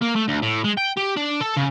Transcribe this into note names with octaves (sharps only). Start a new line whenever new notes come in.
A#3
A3
D2
A2
G#3
G5
G4
D4
A4
C#3